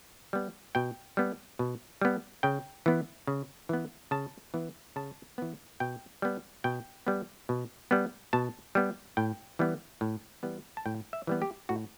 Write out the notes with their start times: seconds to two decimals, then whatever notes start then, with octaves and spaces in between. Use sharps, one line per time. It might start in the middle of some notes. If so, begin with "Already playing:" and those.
0.33 G3 B3
0.75 B2 G5
1.17 G3 B3
1.59 B2
2.01 G3 B3
2.43 C#3 G5
2.86 E3 B3
3.27 C#3
3.69 E3 B3
4.11 C#3 A5
4.54 E3 B3
4.96 C#3 A5
5.38 E3 B3
5.80 B2 G5
6.22 G3 B3
6.64 B2 G5
7.07 G3 B3
7.49 B2
7.91 G3 B3
8.33 B2 A5
8.75 G3 B3
9.17 A2 G5
9.59 E3 G3 B3
10.01 A2
10.43 E3 G3 B3
10.77 A5
10.86 A2 G5
11.13 E5
11.27 E3 G3 B3
11.42 G4
11.69 A2 F#4